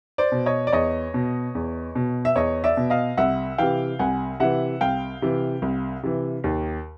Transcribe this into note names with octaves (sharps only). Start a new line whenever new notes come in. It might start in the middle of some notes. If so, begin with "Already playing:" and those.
C5 D5
B2
C#5 D#5
D5
E2 C#5 D#5
B2
E2
B2
E5
E2 C#5 D#5
D5 E5
B2
D#5 F5
C2 E5 F#5
C3 E3 F5 G5
C2 F#5 G#5
C3 E3 E5 F#5
C2 F5 G5
C3 E3
C2
C3 E3
D#2